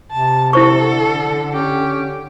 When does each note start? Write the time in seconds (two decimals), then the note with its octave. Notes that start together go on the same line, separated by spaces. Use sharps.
0.12 C3 A5
0.53 D3 E4 A4 C5 C#6
1.53 C#4 G4